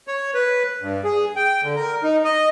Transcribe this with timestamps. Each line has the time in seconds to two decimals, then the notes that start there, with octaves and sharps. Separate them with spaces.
0.07 C#5
0.34 B4
0.82 G2
1.04 G#4
1.36 G5
1.63 D3
1.76 A#4
2.03 D#4
2.24 D#5